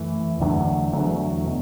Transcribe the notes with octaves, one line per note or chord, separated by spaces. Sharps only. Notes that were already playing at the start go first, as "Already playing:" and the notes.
Already playing: F#2 E3 A3
E2 D3 F#3 A3
E2 D3 F#3 A3
B2